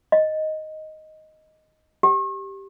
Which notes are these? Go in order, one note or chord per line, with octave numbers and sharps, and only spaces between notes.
D#5
G4